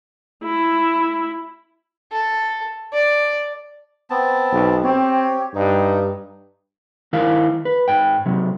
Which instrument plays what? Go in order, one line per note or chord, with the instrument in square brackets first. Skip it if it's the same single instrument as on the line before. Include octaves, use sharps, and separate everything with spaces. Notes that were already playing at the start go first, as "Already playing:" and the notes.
[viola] E4
[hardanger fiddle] A4
D5
[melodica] B3 C4 A5
[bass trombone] B1
[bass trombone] C4 [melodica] G4 C#5
[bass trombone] G2 [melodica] D#4
[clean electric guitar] D#3 E4 A#4 F5
B4
G#2 G5
C3 F#3